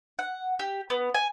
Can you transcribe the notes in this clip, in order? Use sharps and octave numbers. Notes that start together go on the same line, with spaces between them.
F#5
G4
B3
G#5